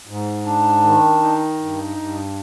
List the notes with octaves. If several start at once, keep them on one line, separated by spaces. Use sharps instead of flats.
G#2
D4
D#3
D#4
G2
G2